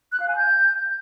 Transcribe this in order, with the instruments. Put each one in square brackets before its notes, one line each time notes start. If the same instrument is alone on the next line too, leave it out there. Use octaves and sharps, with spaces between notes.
[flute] F#6
F5
G#5
G6